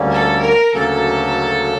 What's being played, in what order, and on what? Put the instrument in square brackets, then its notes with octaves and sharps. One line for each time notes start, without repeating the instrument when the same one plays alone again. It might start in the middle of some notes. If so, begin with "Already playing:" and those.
Already playing: [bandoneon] D2 D3 G3 A#3 C#4
[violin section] A4
A#4
[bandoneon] D2 C#3 F#3 A#3 C#4 [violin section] A4